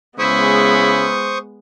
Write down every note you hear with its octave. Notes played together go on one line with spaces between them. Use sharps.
C#3 G#3 B3 E4 C5 C#6 D#6